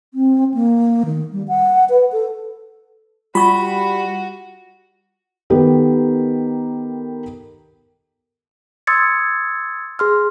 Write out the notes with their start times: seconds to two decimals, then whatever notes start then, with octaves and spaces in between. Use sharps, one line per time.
0.14 C4
0.54 A#3
1.05 D#3
1.33 G3
1.48 F#5
1.90 B4
2.12 A4
3.35 G3 F4 F#4 B5 C#6
5.50 D#3 B3 G4 A4 A#4
8.87 C6 D#6 E6 G#6 A6 C#7
9.99 G#4 C6 F6